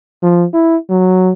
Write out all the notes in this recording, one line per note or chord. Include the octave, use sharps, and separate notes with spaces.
F3
E4
F#3